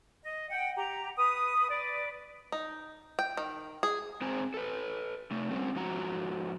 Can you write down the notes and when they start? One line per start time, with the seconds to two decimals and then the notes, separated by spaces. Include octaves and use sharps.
0.23 D#5
0.50 F#5 G5
0.77 G4 A#5
1.16 B4 D#6
1.69 B4 D5
2.52 D#4
3.19 G5
3.37 D#3
3.83 G#4
4.21 G#2 G#3 C4 C5 G#5 A#5
4.54 A4 B4
5.31 C3 A3
5.51 G3 C4 C#4
5.75 G#2 F3 F#4 A#5